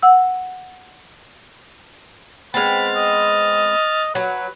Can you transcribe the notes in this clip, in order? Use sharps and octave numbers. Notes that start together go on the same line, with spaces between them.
F#5 E6
G#3 B3 C4 B5 F6 A6
D#5
F#3 B4